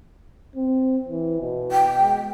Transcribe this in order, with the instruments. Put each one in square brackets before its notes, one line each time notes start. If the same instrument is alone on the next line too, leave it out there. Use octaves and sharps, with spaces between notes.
[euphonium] C4
E3
B2
[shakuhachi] G5
[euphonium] G#3